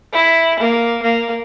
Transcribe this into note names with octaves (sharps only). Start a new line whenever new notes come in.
E4
A#3
A#3